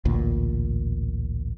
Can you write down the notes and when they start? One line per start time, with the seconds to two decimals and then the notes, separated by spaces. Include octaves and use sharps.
0.05 A1 D2 A#2